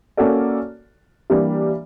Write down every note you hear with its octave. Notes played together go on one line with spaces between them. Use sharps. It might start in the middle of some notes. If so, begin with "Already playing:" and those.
A#3 C#4 F#4 A4 D5
E3 G3 A#3 D4